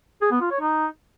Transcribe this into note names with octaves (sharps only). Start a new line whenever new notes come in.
G#4
B3
F4
C#5
D#4